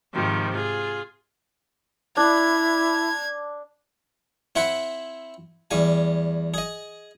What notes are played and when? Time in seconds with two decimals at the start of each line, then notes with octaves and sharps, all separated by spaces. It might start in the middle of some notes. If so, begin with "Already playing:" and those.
0.13 G#2 C3 D#3 F3
0.54 F4 G#4
2.17 D4 E4 G#6
4.56 C4 E4 C5 F#5 B5
5.71 E2 G3 G#5
6.54 G#4 D#5